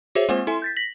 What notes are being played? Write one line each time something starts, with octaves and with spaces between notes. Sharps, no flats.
F#4 G#4 C5 C#5 E5
G#3 A#3 C4 F4 C5
E4 A4 E5 G#5 C6
G6 A6 B6
A#6 B6 F#7